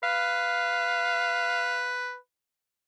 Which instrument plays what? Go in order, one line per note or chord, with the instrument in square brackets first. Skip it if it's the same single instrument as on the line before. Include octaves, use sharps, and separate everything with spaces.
[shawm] B4 [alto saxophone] F5